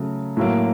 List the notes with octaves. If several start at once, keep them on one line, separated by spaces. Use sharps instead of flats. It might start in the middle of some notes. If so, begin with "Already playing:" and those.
Already playing: C#3 F#3 A3
A2 F#3 A#3